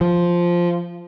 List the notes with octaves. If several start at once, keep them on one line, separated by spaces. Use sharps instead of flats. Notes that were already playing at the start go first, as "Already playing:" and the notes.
F3